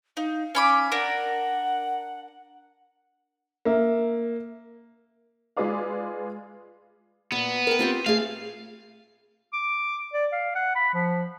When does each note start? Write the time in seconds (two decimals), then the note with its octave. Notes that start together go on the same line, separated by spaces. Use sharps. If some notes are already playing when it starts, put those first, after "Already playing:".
0.17 D#4 F5
0.55 C#4 B5 D6
0.92 D4 A#4 F#5
3.65 A#3 E5
5.57 G#3 F4 G#4 B4 D5 F5
7.32 A#2 B3
7.67 A#4 G5
7.79 C4 F4 G4
8.06 A3 G#4 F5
9.53 D6
10.13 D5
10.32 F5
10.55 F#5
10.76 B5
10.94 F3